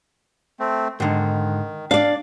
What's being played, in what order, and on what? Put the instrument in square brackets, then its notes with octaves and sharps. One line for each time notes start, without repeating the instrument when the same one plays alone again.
[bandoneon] A3 C4
[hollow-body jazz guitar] G#2 D3 [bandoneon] D#3
[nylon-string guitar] D4 D5 [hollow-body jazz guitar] F5